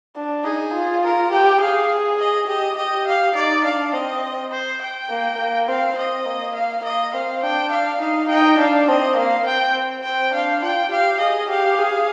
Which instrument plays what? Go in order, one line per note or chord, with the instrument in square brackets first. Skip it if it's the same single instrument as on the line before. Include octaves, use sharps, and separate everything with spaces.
[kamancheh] D4
[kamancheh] D#4 [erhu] G#4
[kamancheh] F4
[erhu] A#4
[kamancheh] G4 [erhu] G5
[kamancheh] G#4 [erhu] F5
[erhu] D#5
[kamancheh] G4 [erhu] D#5
[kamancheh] G4 [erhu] D#5
[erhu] F5
[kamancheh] D#4 [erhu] D5
[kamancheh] D4 [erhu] F5
[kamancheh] C4 [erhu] D#5
[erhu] C5
G5
[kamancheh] A#3
A#3
[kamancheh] C4 [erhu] F5
[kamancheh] C4 [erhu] D#5
[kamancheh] A#3
[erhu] F5
[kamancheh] A#3 [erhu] D#5
[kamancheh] C4 [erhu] F5
[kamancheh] D4 [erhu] G5
[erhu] F5
[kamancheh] D#4 [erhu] F5
[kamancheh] D#4 [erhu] G5
[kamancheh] D4 [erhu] F5
[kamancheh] C4 [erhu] D#5
[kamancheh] A#3 [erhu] F5
[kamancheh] C4 [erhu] G5
[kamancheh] C4 [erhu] G5
[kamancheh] D4 [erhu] F5
[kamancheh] F4 [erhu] G5
[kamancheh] G4 [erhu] F5
[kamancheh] G#4 [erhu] D#5
[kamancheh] G4 [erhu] F5
[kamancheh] G#4